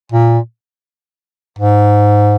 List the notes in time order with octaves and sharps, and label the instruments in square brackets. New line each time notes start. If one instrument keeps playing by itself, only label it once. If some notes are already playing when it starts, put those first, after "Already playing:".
[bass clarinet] A#2
G#2